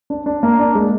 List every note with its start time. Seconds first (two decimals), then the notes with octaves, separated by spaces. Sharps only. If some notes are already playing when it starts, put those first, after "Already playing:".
0.10 D4
0.26 D4
0.43 A#3
0.59 D4
0.75 G#3